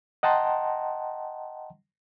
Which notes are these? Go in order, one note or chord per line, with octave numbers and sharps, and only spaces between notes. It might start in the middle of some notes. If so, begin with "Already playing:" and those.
D#5 F#5 G5 A5 A#5 C6